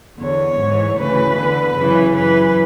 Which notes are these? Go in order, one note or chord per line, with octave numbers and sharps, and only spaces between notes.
E2 D3 C#5
G#2
E3
D2 C#3 E3 B4
E2 D3
F#2 C#3 E3
F#2 E3 B4